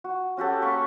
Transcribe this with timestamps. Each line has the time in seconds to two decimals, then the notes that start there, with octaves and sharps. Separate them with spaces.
0.04 F#4
0.37 C#4 F#4 G4 A4
0.62 A#3 B5 C#6